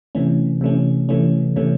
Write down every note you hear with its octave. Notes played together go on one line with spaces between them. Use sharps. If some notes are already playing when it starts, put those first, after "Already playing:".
C3 E3 A3 C#4
C3 E3 A3 C#4
C3 E3 A3 C#4
C3 E3 A3 C#4